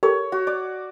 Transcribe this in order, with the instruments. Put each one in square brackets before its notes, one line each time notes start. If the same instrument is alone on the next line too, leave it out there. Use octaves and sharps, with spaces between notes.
[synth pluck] G4 A4 A#4 [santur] C#5
[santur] F#4
D5